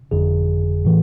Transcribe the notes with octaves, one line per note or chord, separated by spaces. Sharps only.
G1 F2 D3 G#4
A2 E3